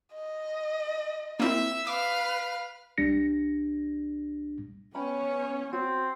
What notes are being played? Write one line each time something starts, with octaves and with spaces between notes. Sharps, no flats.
D#5
A#3 C4 E4 E5
B4 F5 D6
C2 G3 D4 A#6 C#7
B3 C#4 B4 C#5 G5 B5
C4 F#4